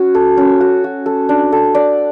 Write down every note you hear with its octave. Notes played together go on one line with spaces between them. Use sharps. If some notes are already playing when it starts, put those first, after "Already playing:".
Already playing: C#4 F#4
A4
C#4
F#4
F#4
A4
D4
A4
D5